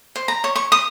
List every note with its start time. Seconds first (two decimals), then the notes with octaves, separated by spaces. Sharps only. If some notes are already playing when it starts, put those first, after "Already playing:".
0.16 C5
0.28 A#5
0.44 C#5
0.56 C#6
0.72 D#6